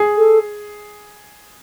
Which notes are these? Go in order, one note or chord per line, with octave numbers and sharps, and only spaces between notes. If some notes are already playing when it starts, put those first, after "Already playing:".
Already playing: G#4
A4